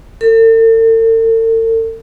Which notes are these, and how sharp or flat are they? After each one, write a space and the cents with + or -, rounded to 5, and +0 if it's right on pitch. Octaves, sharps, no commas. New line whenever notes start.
A4 +45